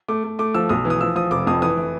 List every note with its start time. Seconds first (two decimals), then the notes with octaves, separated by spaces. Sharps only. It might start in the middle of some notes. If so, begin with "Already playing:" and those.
0.08 A3 D6
0.24 A3
0.39 A3 D6
0.54 F3 E6
0.69 B1 D#6
0.85 E3
0.90 D#6
1.01 F3 E6
1.16 F3 D#6
1.31 F1 D6
1.47 F2 D#6
1.62 E3 D#6
1.77 E3